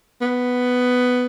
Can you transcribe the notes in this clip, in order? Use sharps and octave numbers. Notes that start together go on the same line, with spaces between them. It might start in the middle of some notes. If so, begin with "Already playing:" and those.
B3